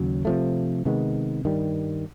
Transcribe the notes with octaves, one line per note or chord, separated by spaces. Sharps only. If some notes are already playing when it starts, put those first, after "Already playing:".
Already playing: D#2 C#3 F#3
C3 F3 A3
C3 D#3 G#3 B3
G2 D#3 G3